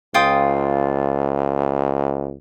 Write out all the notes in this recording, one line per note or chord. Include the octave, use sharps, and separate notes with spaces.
C#2 F4 G5 D#6